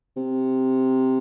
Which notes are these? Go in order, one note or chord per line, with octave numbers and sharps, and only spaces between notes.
C3